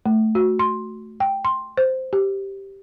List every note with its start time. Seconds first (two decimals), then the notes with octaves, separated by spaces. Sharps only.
0.06 A3
0.35 F#4
0.59 C6
1.20 G5
1.45 C6
1.77 C5
2.13 G4